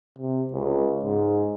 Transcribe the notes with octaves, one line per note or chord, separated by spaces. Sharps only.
C3
C#2
G#2